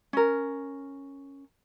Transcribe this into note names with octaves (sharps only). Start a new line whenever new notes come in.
C#4 A#4